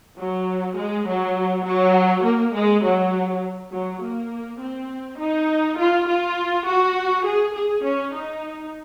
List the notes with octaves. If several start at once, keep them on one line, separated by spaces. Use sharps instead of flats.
F#3
G#3
F#3
F#3
A#3
G#3
F#3
F#3
A#3
C4
D#4
F4
F4
F#4
G#4
G#4
C#4
D#4